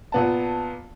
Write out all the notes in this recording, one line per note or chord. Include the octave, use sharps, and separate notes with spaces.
A#2 B3 A5